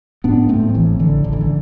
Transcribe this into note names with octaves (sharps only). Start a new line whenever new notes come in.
A2 B3 D4
A2 A3 C4
F3
A1 E3
A1 D3
A1 D3
E3
D3